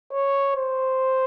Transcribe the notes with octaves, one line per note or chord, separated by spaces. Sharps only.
C#5
C5